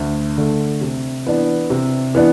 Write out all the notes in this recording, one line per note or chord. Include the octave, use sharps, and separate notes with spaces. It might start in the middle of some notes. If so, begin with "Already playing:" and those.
Already playing: D2
D3 A3
C3
E3 B3 D4
C3
E3 B3 D4